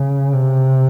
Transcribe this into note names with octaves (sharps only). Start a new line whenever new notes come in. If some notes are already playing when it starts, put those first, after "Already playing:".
Already playing: C#3
C3